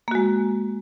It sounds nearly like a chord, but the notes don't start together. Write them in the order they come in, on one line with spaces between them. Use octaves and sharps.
A#3 F#4 G#3